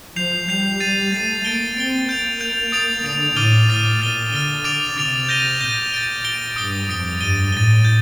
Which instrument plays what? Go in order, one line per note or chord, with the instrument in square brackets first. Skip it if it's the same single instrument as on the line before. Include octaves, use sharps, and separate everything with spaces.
[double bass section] F3 [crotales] G6 C7 F7
[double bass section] G3 [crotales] G6 C7 F7
[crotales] A6 C7 D#7
[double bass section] A3 [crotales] A6 C7 D#7
[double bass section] A#3 [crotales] A6 D7 G7
[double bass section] C4 [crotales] A6 D7 G7
[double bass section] A#3 [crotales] G6 D7 F7
[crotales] G6 D7 F7
D#6 A6 D7 F7
[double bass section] D3 [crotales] D#6 A6 D7 F7
[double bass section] A2 [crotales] D6 F6 A6 D#7 G7
[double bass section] A2 [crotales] D6 F6 A6 D#7 G7
[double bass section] A#2 [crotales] F6 A6 D#7 G7
[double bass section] D3 [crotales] F6 A6 D#7 G7
[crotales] D6 A6 D7 F7
[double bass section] C3 [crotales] D6 A6 D7 F7
[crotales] G6 A#6 D#7 G7
[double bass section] A#2 [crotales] G6 A#6 D#7 G7
[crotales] A6 D7 G7
A6 D7 G7
[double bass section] G2 [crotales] D#6 A6 D7 G7
[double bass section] F2 [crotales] D#6 A6 D7 G7
[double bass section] G2 [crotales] A6 D#7 G7
[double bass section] A2 [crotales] A6 D#7 G7
[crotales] G6